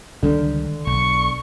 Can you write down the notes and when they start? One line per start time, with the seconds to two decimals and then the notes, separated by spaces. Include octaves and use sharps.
0.23 C#2 D3 D#3 G3
0.87 B1 C#6